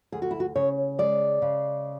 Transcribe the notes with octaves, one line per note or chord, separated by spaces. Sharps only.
D2 G#4
F#4
E4
F#4
C#3 C#5
G#3 D5
C#3